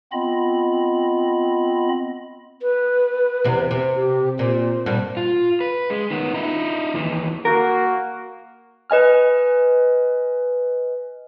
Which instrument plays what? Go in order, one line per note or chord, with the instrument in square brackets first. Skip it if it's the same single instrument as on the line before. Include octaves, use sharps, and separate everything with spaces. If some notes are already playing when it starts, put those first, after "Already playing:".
[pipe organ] B3 C4 F4 D#5 B5
[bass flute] B4
[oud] E2 C3
C3
[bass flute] G4
[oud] A#2 [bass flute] C5
[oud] G2 A#2
[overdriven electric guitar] F4
B4
G#3
D#3 B3
D#4 E4
D#2 E3
[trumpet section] A#3 F#4 [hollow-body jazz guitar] A#4
[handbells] B4 D#5 G#5 F6